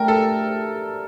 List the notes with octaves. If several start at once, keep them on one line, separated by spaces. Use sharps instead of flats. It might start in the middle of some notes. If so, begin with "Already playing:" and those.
Already playing: A3 D4 G4 A#4
A4